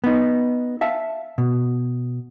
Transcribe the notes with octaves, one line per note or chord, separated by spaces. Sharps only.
B3 D#4
E5 F5 A5
B2